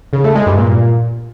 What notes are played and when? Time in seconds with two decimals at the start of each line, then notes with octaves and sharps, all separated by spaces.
0.13 C#3
0.24 A3
0.35 G#3
0.46 G2
0.58 A#2